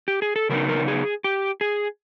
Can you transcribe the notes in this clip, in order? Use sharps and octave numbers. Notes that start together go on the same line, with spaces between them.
G4
G#4
A4
C#3 F#3 B3 D#4 A#4
A#4
G#4
G4
G#4